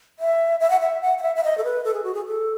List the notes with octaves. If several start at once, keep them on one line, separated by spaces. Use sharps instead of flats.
E5
E5
F#5
E5
F#5
F#5
E5
E5
D#5
A4
B4
A4
G#4
F#4
G#4
A4